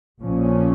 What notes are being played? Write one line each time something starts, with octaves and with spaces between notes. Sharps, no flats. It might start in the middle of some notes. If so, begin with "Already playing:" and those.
A#1 A#2 F3 C#4